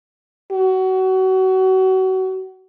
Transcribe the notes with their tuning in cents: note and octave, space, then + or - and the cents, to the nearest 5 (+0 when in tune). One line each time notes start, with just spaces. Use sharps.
F#4 +30